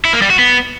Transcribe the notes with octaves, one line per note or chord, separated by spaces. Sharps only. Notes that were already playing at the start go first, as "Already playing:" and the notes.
E4
A#3
G3
F#4
B3